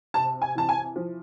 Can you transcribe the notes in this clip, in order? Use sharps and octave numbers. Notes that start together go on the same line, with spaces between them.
C3 A5
G#5
E3 A5
G#5
F3